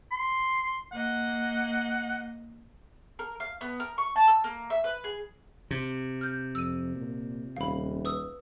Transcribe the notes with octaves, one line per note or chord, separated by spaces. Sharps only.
C6
A#3 D#5 F#5
A#4
F5
B3
A#4
C#6
A5
E6
A#3
E5
B4
G#4
C3
F6 G6
F2 E6 D#7
A#2
D#1 F5 B5
B4 D#6 E6